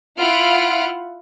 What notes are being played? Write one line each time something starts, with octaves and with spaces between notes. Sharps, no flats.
E4 F4 F#5 F6 D7